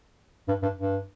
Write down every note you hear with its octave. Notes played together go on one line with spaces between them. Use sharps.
G2
G2
G2